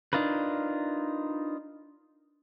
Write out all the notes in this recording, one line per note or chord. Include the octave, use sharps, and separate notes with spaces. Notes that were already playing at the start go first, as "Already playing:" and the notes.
D4 D#4 F4 A#4 B4